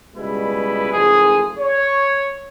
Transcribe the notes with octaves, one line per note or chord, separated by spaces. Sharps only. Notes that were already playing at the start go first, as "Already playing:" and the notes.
C#2 B2 G3 G#3 E4 B4
F#1 F3 A3 G#4
C#5